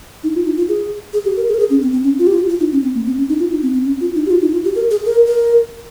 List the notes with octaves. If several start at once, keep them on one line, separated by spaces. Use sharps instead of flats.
D#4
F4
D#4
F4
G#4
G#4
G4
A#4
G#4
A#4
G#4
C#4
C4
C4
C#4
F4
G4
F4
F4
D#4
C#4
C4
A#3
C4
C#4
D#4
F4
D#4
C4
C4
C#4
F4
D#4
G4
F4
D#4
F4
G4
A#4
G#4
A#4
A#4